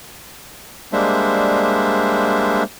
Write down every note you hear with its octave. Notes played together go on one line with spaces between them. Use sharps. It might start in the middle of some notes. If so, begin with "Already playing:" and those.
G3 G#3 A#3 D4 C5 E5